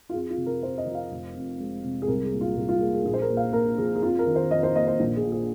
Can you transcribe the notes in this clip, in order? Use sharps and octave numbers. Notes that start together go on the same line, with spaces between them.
F4
F2 G#4
F4
C3
A#4
F2 C5
D#5
F3
F5
F1
F2
G#3
C3
G#4
C2 A#4
G#4
A#2
F4
C2 G#4
F4
A#3 G#4
G#4
A#1 G#4
C5
A#4
A#2
F5
A#3 A#4
F3 G#4
G#4
F2 F4
A#4
D#3
C5
F2 D#5
C5
A#3 D#5
C5
A#1
G#4
A#2
G#4